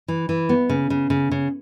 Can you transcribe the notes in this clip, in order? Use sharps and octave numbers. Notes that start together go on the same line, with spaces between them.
E3
E3
B3
C#3
C#3
C#3
C#3